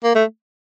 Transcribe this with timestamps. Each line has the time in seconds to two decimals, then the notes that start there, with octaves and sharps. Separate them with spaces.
0.04 A#3
0.15 A3